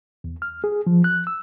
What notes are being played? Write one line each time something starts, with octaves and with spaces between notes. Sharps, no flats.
E2
F6
G#4
F3
F#6
E6